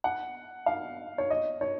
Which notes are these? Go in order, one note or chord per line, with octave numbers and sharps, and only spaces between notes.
F#5
F5
C#5
D#5
C#5